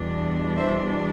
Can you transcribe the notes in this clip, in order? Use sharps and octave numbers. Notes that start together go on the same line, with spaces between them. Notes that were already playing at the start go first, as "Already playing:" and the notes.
Already playing: E2 B2 G3 D4
C5 E5